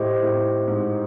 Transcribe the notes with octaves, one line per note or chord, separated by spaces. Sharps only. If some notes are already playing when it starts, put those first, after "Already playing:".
Already playing: A2 G4 C5 D#5
A2
G#2